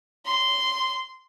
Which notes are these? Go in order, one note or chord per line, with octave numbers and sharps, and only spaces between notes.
C6